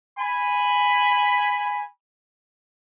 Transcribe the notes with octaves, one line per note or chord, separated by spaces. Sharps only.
G#5 B5